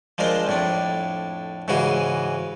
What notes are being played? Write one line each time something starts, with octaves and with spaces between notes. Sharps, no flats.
F3 G#3 D4 A#4 C5
F2 A2 D4
G#2 C#3 E3 F#4 G#4